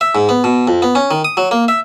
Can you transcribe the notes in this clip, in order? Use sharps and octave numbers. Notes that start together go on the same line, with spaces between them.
E5
G#2
B3
B2
F2
B3
C#4
D#3
D#6
F#3
A#3
E5